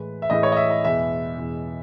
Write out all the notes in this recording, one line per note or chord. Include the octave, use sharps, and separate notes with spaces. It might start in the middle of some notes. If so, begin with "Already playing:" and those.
Already playing: A2 E3 G#3 B4
E5
A2 E3 G#3 D#5
C#5
D#5
E5
D#5
E2 B2 G#3 E5
E2 B2 G#3